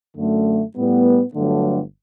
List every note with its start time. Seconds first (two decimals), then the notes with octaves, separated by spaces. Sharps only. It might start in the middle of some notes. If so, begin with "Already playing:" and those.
0.15 F#2 D3 A3
0.75 A2 G3 B3
1.33 G1 G2 D3 F#3 A3